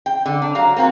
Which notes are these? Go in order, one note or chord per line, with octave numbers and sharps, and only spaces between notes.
G5
D3
D4
F#3 F5 A#5
A#3 C4 F#4